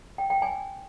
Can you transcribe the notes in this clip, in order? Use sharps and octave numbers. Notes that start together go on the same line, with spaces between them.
G5
G5
G#5